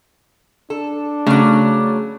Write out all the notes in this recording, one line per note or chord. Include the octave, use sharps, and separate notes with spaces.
D4 A4
C#3 F#3 A3 D6